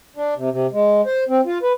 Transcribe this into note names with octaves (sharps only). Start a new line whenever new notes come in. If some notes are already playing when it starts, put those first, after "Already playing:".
D4
C3
C3
G#3
C5
C4
F4
B4